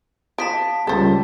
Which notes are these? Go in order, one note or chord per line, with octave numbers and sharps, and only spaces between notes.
F3 A5 B6 D7
C#2 G3 A4 C5